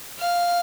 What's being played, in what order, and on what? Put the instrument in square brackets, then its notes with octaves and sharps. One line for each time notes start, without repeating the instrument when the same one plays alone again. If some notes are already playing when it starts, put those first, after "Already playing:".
[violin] F5